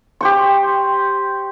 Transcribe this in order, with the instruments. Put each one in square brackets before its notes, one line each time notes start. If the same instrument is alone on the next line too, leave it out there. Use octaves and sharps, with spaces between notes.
[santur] G4 C5 C#6